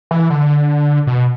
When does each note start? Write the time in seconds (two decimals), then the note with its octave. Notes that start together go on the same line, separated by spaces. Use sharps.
0.11 E3
0.30 D3
1.07 B2